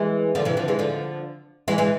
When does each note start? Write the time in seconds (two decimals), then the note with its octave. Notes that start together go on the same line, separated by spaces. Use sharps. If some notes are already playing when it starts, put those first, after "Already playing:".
Already playing: E3 G#3
0.35 D3 F3
0.45 C3 E3
0.57 D3 F3
0.68 E3 G#3
0.79 D3 F3
1.68 E3 G#3
1.78 E3 G#3